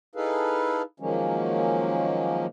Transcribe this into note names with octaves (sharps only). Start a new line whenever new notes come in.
D#4 E4 G#4 A4 B4 F5
D#3 F3 F#3 G#3 A#3 C#4